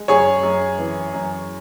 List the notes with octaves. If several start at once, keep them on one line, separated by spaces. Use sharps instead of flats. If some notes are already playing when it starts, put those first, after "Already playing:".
Already playing: G#3
F#2 G#4 C#5
F#2
E3
F#2